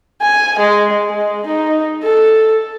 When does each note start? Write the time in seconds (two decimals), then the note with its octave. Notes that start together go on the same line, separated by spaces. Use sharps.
0.22 G#5
0.59 G#3
1.09 G#3
1.47 D#4
2.04 A4